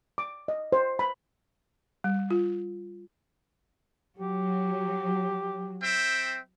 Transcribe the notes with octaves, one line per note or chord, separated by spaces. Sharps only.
D6
D#5
C5
B5
G3
F4
F#3 G4
C4 E5 G5